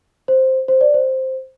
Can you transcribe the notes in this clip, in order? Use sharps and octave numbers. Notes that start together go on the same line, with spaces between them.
C5
C5
D5
C5